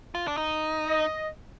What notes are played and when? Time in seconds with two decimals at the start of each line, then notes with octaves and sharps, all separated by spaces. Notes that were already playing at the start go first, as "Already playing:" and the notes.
0.15 F4
0.28 D4
0.37 D#4
0.86 D#5